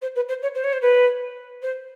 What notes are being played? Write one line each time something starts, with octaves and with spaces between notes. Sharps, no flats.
C5
B4
C5
C#5
C5
C#5
C5
B4
C5